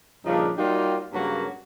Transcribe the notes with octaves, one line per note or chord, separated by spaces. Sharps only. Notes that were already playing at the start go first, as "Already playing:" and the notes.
G2 A#2 C#3 F3 D4 D#4
F#3 G3 A#3 D#4 F4 G4
G2 C#3 F#3 A#3